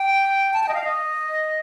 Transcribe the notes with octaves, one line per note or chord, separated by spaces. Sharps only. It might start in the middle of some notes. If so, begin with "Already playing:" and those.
Already playing: G5
A5
G5
D#5
F5
D#5